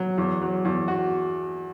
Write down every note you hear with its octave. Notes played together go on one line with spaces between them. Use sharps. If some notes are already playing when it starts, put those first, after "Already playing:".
Already playing: F#3
E2
F#3
E2
F#4